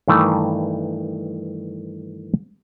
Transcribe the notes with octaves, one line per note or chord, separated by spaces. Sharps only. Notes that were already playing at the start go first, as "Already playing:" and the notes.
G2 D#3 E3 A3